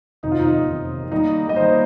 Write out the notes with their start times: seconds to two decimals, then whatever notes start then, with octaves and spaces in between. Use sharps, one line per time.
0.23 F2 C3 D#3 D#4
0.32 F4
0.39 D#4
0.67 F2 C3 D#3
1.12 D#3 G3 A#3 D#4
1.49 D#5
1.56 D#3 G3 A#3 C5